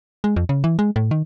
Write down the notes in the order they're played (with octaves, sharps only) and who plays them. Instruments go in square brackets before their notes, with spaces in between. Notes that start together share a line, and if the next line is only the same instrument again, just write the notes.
[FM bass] G#3
F2
C#3
E3
G#3
A2
D#3